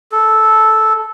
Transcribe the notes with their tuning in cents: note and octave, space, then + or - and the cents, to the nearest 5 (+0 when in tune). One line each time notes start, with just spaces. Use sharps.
A4 -10